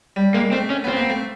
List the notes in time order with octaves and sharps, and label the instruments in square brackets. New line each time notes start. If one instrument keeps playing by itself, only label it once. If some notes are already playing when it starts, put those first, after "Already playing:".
[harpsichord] G3
[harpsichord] G#3 [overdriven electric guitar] A#3
[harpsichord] A3 [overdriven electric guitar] C4
[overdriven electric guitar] C#4
[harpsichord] B3 [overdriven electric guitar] C4
[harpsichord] A#3
A3